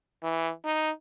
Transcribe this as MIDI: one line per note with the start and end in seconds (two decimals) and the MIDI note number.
0.23 0.51 52
0.65 0.90 63